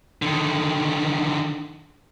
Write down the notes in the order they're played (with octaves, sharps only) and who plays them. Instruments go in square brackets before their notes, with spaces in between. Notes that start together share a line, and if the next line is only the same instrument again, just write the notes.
[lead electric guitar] D3 D#3